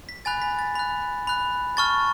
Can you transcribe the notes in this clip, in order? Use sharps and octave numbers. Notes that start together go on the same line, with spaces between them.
B6
G#5 B5 F#6 A6
B6
A6
B5 F#6
B5 F#6
A5 C#6 F6 A6